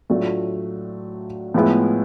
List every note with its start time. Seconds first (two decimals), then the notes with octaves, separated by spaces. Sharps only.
0.10 A2 F#3 A3 D4 F4
1.54 A2 F3 G#3 B3 E4